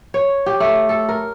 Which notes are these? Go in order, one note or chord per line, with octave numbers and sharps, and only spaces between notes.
C#5
G4
A3
A4
A#4